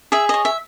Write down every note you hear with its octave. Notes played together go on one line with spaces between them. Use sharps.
G#4 E5
C#5 D#5
E5